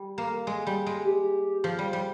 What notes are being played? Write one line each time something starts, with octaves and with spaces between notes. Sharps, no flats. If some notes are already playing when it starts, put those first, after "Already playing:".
Already playing: G3
A#3
G#3
G3
G#3
G4
F3
G3
G3